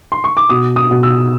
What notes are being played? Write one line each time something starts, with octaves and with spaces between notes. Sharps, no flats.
C6
C#6
D6
B2 D#6
D#6
B2
E6